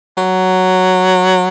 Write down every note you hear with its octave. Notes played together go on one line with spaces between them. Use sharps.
F#3